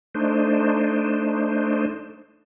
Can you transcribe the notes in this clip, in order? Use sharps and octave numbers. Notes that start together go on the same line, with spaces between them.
A3 D4 D#4 C5